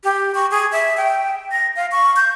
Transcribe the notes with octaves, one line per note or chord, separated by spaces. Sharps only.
G4
C#6
G#4
E5
G5
A#6
F5
C#6
G6